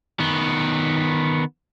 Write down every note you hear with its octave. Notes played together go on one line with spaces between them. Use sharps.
D#3 B3